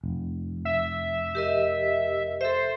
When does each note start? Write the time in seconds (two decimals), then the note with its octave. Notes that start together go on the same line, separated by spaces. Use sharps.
0.04 F1
0.65 E5
1.35 G4 A#4 D#5
2.41 A4 C5 E5